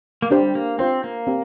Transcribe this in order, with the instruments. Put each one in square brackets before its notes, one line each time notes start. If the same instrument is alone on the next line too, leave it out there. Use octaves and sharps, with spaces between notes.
[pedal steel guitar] A#3
[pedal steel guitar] G3 [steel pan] D4 G4 C5
[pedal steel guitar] A#3
[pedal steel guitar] C4 [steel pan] F4 C5 G5
[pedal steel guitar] A#3
[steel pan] C4 G4